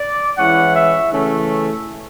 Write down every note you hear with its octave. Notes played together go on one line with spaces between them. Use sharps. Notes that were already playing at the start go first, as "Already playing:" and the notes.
Already playing: D5
E3 G#3 C#4 E4 F#5
E5
C#3 E3 A3 C#4